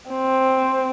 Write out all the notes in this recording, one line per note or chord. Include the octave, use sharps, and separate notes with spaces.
C4